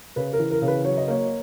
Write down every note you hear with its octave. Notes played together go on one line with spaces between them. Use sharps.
C#3 B4
A#4
E3
A#4
C#3
B4
F#3 C#5
D#5
A#3 C#5